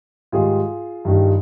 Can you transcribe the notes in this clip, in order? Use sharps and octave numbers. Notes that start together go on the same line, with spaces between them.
G#2 D#3 G3 F4 G#4
G2 D#3 G3